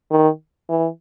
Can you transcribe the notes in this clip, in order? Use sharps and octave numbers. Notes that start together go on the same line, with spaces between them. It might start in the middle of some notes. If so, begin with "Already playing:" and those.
D#3
E3